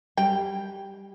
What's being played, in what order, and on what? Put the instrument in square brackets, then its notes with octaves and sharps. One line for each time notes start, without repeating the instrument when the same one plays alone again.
[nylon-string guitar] G3 [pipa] G5